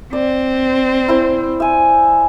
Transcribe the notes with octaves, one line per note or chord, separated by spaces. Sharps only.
C4 D5
E4 C5
E5 G#5